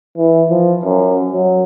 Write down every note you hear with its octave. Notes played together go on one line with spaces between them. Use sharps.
E3
F3
F#2
F#3